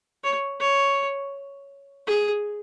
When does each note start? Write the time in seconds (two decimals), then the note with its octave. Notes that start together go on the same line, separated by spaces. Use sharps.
0.23 C#5
0.60 C#5
2.07 G#4